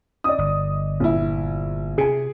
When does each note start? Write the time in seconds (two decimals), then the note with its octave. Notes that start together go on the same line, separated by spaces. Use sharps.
0.24 D5 D#5 D#6
0.38 G1
1.00 A#1 E4
1.98 C3 G#4 G#5